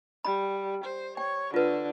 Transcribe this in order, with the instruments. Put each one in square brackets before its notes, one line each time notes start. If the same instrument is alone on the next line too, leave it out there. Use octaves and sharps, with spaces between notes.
[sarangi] G3 [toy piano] B5
[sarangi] C5
[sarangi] C#5 [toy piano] G5
[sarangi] D3 [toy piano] F4 B4